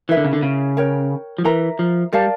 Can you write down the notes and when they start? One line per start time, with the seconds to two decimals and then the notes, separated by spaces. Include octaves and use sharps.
0.09 E3 E4 A#4 E5
0.17 D3
0.25 C#3
0.33 D3
0.42 C#3
0.77 A#4 C#5 G5
1.38 F3
1.45 E3 A#4 E5 A#5
1.79 F3
2.13 G3 A#4 D5 F5 A5